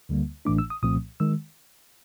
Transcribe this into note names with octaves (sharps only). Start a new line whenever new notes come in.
D2 D3 G3 A#3
A1 A2 E3 A3 D4 D6
E6
D#6
C2 A#2 F3 A3 C4 D#6
D#3 G#3 E6